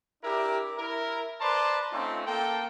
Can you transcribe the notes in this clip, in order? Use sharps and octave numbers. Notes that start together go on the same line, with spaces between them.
D4 E4 G4 A#4
E4 A#4
B4 C5 D5 A5 A#5 C6
A3 C4 C#4 D#4 F4
A#3 A4 G5